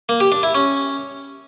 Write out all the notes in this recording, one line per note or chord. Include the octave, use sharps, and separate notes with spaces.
A#3
G4
D4
E4
C#4